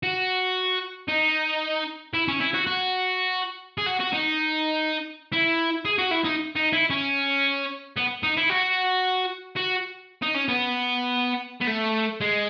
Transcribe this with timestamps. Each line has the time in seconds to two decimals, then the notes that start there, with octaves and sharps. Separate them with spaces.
0.03 F#4
1.08 D#4
2.14 E4
2.28 C#4
2.40 E4
2.54 F#4
2.67 F#4
3.78 G#4
3.86 F#4
4.00 F#4
4.13 D#4
5.32 E4
5.85 G#4
5.98 F#4
6.11 E4
6.24 D#4
6.56 D#4
6.73 E4
6.90 C#4
7.97 B3
8.23 D#4
8.37 E4
8.49 F#4
9.56 F#4
10.22 D#4
10.34 C#4
10.48 B3
11.61 B3
11.68 A3
12.21 G#3